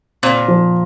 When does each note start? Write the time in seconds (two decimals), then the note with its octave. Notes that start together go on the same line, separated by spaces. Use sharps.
0.23 A#2 C4
0.48 F3